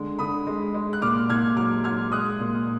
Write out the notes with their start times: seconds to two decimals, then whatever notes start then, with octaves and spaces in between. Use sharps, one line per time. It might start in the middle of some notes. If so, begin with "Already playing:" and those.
Already playing: D3 G#3
0.18 D3 B5 D#6
0.47 G#3
0.74 G#3
0.93 F#6
1.02 A#2 D6 F6
1.29 A#2 F6 G#6
1.57 F#3 D6 F6
1.84 F#3 F6 G#6
2.12 G#3 D#6 F#6
2.40 A#2